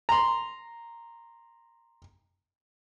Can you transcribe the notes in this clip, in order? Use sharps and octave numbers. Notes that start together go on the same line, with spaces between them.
A#5 C6